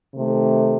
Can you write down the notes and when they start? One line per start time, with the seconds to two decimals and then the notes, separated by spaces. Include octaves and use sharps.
0.13 C3 D#3 A3